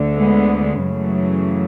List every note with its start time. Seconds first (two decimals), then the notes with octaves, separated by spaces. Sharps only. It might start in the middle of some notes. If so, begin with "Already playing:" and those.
Already playing: D2 D3
0.17 G#3 B3
0.84 F#2 C#3 E3 F#3 A3